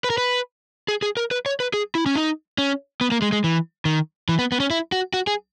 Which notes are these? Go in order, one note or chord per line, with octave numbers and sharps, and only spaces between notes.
B4
A#4
B4
G#4
G#4
A#4
B4
C#5
B4
G#4
E4
C#4
D#4
C#4
B3
A#3
G#3
G#3
E3
D#3
E3
B3
B3
C#4
E4
F#4
F#4
G#4